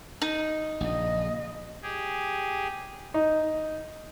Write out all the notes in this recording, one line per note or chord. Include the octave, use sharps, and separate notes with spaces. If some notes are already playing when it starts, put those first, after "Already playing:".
D#4
A#1 C#3 D#5
G4 G#4
D#4